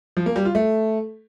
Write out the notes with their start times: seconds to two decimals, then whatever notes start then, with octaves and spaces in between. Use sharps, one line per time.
0.17 F3
0.26 A#3
0.36 G3
0.45 F4
0.55 A3